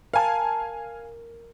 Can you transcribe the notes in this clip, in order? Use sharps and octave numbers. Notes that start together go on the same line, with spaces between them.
A#4 F5 G#5 A5